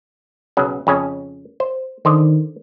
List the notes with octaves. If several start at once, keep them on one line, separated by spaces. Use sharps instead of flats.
B1 C#3 F#3
F2 C#3 C#4
C5
D3 D#3 C5 D#5